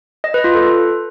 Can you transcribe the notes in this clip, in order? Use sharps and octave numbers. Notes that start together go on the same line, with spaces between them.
D#5
B4
F4
A4